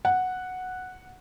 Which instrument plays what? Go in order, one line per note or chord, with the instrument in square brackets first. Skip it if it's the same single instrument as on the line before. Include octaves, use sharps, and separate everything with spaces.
[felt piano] F#5